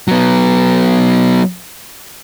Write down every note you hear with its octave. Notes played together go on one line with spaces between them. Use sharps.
F#3 B3